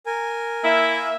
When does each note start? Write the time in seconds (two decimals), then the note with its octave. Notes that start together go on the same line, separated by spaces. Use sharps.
0.06 A#4 G#5
0.64 A#3 E4 E5